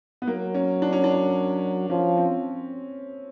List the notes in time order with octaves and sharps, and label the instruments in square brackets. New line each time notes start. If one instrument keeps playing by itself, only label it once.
[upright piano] B3
[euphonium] F#3 [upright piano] A#3
[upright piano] C#4
D4
C#4
D4
[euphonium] F3 [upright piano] C#4
[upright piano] C4